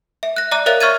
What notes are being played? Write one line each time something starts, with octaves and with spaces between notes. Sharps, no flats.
E5
F#6 A#6
D5 E5 A#5 D6 F#6
A#4 C#5 E5 F5 F#6 A6
E5 C#6 F6 G#6 A6 D#7